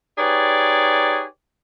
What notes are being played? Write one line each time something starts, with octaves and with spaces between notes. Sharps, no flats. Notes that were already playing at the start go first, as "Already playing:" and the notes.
D#4 G4 G#4 B4 C#5 D5